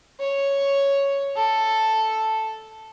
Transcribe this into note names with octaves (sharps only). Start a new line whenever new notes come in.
C#5
A4